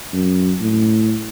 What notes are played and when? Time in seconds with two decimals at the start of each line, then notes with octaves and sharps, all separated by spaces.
0.13 F#2
0.60 A2